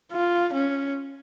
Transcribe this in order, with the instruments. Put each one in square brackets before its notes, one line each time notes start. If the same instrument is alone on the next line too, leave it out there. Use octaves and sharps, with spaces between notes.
[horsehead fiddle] F4
C#4